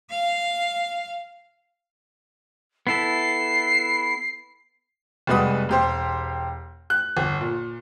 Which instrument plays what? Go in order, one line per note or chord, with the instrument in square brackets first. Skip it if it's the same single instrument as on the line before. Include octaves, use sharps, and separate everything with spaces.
[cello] F5
[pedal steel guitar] B3 E4 A4 [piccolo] C7
[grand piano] F1 G3 G#3 F#4 B4 D#6
E1 G4 C5
F#6
G1
A#2